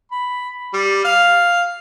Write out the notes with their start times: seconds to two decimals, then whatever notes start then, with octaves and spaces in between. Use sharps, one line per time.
0.12 B5
0.73 G3
1.05 F5